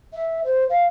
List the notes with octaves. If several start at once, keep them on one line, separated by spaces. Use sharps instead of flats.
E5
C5
F5